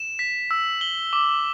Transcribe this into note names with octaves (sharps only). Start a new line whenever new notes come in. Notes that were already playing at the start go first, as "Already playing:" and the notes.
Already playing: E7
B6
E6
G7
D6